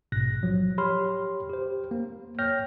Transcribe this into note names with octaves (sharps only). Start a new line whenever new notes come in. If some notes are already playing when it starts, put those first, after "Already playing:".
A#1 G#2 B2 F#6 A#6
F3 F#3
G4 C#5 B5 C6 F6
G4 C5
A#3
C#5 G5 F6 G6 A#6